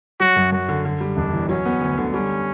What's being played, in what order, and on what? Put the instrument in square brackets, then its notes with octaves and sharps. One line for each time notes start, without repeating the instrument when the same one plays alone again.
[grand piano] F#3 [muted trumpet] F#4
[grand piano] F#2
[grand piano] F#2 [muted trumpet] F#4
[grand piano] D3
D3
G3
[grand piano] E1 [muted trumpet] D4
[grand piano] E2
[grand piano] F#3 [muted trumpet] C#4
[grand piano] B3
D2
D3
[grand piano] G3 [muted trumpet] C#4